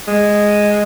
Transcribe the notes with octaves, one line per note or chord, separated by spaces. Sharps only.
G#3